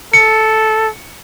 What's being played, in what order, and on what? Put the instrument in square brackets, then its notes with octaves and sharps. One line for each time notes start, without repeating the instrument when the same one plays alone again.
[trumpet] A4 [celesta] C#7